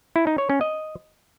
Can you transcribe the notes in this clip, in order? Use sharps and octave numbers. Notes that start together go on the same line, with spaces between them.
E4
D#4
C#5
C#4
D#5